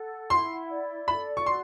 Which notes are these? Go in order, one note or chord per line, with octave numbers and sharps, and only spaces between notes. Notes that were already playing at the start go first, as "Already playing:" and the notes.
Already playing: A4 F#5
E4 C6
D5
A4 B5
C#6
F#4 C6